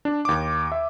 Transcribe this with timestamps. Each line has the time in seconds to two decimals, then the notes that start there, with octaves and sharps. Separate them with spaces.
0.05 D4
0.25 D#2 D6
0.72 E5